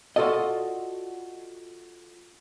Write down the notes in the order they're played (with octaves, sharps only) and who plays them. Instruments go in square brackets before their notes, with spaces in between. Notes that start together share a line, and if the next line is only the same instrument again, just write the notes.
[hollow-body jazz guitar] F4 F#4 A4 D5 D#5